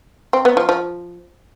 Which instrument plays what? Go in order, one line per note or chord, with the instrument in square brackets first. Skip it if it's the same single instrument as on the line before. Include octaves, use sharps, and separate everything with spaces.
[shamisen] C4
B3
F3
F3